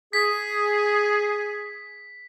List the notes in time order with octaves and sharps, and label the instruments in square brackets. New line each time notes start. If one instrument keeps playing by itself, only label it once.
[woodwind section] G#4 [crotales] B6